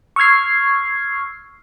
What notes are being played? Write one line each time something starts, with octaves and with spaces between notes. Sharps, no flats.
C#6 E6 F6 G#6 C7